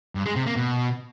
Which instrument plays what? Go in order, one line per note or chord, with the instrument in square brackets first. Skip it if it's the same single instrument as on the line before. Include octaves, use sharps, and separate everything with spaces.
[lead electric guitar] G2
G#3
C3
A#3
B2